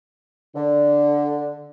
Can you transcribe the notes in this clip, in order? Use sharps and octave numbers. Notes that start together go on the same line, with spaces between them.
D3